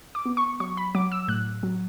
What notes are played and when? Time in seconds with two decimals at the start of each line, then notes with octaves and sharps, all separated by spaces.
0.15 D6
0.26 B3
0.37 C#6
0.60 F#3 C#6
0.77 B5
0.95 F#3 D6
1.12 E6
1.28 A2 F#6
1.63 F#3